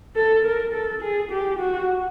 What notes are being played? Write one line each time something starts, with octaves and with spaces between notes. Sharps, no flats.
A4
A#4
A4
G#4
G4
F#4